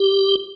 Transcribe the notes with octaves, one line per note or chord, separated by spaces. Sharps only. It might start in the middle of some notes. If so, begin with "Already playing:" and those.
Already playing: G4